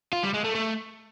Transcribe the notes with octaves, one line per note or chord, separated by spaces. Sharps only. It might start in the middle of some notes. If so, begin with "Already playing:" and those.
F4
G3
G#3
A3
A3